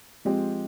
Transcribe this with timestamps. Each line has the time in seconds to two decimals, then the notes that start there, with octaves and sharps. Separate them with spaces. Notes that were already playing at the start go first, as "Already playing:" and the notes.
0.25 F3 G#3 C4 G4